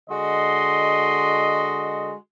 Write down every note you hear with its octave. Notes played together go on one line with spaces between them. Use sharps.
D3 G#3 F#4 D#5 C6